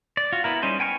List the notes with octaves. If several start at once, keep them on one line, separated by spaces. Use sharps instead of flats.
D5
F4 F#4
B3 E4 A#4
G3 C#4 D#4 C5
B3 G5 G#5 C#6 F6